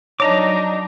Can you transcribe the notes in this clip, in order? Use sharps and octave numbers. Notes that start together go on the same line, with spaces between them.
F#3 D4 D#4 C#5 D#5 A#5 D6